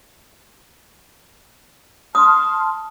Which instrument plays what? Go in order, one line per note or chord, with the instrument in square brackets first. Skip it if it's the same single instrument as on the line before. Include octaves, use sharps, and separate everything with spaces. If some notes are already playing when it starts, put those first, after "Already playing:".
[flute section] A5 C6 F6 [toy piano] D#6